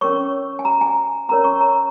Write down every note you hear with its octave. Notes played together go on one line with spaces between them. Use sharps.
C#4 A#4 C#5 C#6
G#5
A#5
G#5
C#4 A#4 C#5 A#5
C#6
A#5